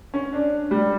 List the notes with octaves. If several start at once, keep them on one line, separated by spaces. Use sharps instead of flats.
C#4
D4
G3